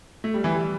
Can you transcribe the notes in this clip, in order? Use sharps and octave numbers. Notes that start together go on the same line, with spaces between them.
A3
G3
E3
G3